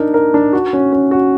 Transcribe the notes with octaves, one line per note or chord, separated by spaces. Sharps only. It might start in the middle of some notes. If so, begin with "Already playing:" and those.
Already playing: D4 D#4 A#4
A#4
D4
F#4
C#4
C#4
F#4